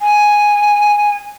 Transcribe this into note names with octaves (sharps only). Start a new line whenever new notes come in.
G#5